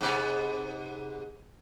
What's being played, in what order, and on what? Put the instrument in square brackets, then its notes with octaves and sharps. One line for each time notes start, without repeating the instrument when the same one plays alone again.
[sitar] G#2 C3 B3